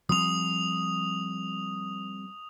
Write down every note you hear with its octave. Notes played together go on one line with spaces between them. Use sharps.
F3 G3 C4 D#6 F7